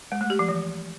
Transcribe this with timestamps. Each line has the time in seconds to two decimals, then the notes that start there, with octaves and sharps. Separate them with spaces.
0.12 G#3
0.21 A3
0.30 G4
0.39 F3
0.48 E3